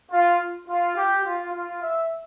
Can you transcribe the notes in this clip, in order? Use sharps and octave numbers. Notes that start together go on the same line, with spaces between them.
F4
F4
G4
F4
F4
E5